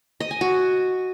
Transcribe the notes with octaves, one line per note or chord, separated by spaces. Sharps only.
D#5
G#5
F#4